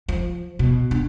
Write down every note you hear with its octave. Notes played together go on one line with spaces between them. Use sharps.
F3
B2
D4